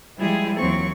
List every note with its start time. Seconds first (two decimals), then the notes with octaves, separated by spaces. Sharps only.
0.19 F3 G3 G#3 E4 G4 G#4
0.59 D#2 E3 F#3 C4 C#6